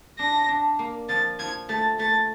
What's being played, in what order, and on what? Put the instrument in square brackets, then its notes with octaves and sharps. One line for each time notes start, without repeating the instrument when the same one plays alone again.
[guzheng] D4 [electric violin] A#6
[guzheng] D4
A#3
[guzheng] F3 [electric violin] A6
[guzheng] F3 [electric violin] G#6
[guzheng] A3 [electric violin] A6
[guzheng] A3 [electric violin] A6